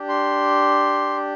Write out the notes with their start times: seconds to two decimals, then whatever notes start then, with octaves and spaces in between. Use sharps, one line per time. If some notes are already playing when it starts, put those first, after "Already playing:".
Already playing: D4 G4
0.09 C6